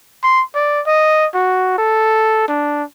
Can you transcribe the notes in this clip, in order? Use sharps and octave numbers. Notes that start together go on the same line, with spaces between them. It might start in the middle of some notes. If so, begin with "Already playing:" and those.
C6
D5
D#5
F#4
A4
D4